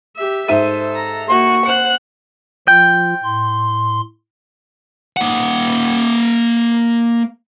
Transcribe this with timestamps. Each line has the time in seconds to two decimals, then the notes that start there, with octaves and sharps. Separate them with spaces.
0.17 G4 E5
0.48 G#2 A4 C5 E5 D#7
0.95 A#5
1.29 A#3 F#4 C#6
1.66 C5 F#5 F#6 C#7
2.68 F3 F4 G5
3.23 A2 C6
5.17 A#3 F#5